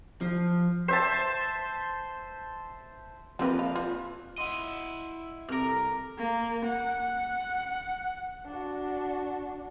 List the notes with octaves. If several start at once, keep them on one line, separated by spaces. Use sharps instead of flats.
F3
C5 E5 A5
F3 A#3 C4 A#4 B4
F5
F4
E4 D#5 F#5 C6
C2 A4 A#4 D6 F6
A#3
F#5
D4 F#4